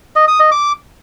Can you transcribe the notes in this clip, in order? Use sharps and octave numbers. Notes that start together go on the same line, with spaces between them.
D#5
D#6
D#5
D6